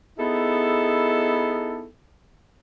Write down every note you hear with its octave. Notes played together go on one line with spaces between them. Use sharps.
B3 D#4 E4 G#4 A4